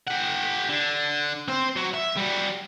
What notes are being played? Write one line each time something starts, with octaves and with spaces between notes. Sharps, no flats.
G4 F#5
D3
C4 C5
F#3 F#4
E5
G3 F#4